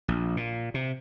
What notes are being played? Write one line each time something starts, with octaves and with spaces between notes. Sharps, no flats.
A#1
A#2
C3